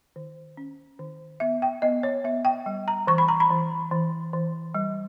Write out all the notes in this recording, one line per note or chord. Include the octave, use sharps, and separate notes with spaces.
D#3
C#4
D#3
B3 E5
G5
B3 D#5
C#5
B3 E5
G5
G3
A#5
E3 C#6
B5
A#5
B5
E3
E3
E3
G3